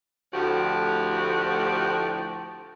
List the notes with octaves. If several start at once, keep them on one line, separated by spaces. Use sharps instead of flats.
D2 A2 F3 F#4 G4